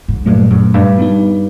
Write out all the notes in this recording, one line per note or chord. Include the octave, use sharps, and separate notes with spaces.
G#2
G2 A#2 F#3 A3
F#2
G2
G3 B3 D#4